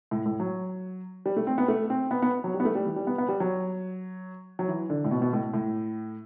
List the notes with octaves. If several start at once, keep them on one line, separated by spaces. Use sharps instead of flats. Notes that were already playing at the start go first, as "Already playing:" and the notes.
A2
A2
F#3
G3
A3
C4
B3
A3
C4
B3
B3
F#3
G3
B3
A3
G3
E3
G3
B3
B3
G3
F#3
F#3
E3
D3
A2
B2
B2
A2
A2